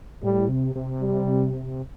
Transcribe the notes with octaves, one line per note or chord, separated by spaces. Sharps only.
A2 G3
C3
C3
G3